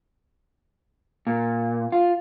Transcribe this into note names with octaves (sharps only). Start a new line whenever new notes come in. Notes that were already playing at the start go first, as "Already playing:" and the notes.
A#2
F4